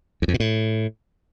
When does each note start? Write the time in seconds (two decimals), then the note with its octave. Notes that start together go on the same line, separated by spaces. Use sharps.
0.22 E2
0.28 F2
0.34 B2
0.40 A2